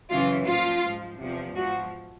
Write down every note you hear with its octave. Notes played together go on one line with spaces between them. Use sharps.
F#2 C#3 E3 F4
A#2 F3 F4
G#2 F3
E2 C3 F3
G#2 F3 F#4